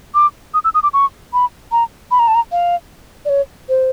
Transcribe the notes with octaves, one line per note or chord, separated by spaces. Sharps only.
D6
D#6
E6
D#6
D6
C#6
B5
A#5
B5
A#5
A5
A#5
F5
D5
C#5
C5